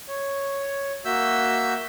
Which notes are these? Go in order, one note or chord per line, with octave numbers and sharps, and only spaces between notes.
C#5
A#3 F#4 E5 E6 G6